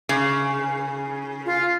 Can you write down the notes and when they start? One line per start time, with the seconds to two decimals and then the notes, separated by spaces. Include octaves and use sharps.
0.09 C#3
1.46 F4